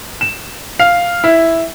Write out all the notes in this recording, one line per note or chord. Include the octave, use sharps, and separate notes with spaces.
E7
F5
E4